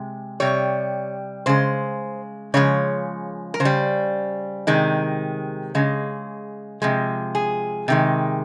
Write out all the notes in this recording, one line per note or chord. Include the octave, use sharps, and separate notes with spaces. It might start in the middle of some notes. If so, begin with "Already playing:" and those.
Already playing: C3 G#3
C3 G3 C#5
C#3 G#3 C5
C#3 F3 G#3 C#5
A#4
C#3 C5
G3
C3 D#3 G#3
C#3 G#3
C3 F3 G#3
G#4
C3 D#3 G#3